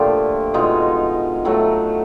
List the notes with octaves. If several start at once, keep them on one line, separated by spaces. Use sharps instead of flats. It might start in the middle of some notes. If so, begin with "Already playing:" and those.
Already playing: A#2 D3 F3 A3 F4 G4
B2 G#3 D#4 F4
A2 F#3 A3